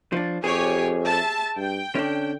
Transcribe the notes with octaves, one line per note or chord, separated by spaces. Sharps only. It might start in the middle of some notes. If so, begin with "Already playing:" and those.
F3 D4
F2 G4 G#4 C#5 G#5
E5 A5
G2 G5
D3 C#4 D4